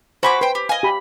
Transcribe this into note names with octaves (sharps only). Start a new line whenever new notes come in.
F#4 C5 G#5 B5 C#6 D6
B4 C5 G5
G4
D#5 F5 G#5
G4 B5